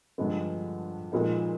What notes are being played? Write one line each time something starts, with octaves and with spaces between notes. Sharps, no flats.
G2 D3 F3 G#3 B3
A#2 F3 G#3 B3 D#4